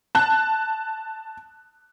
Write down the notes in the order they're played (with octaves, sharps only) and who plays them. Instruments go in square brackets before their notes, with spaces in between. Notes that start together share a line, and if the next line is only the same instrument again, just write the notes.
[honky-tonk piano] A5 F#6